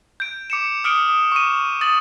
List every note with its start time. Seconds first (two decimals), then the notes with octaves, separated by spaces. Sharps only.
0.20 G6 D7
0.50 D6 C#7 E7
0.84 D#6 F6 C#7 D7 G7
1.09 D#6
1.32 C#6 D#7
1.81 D#6 A6 F#7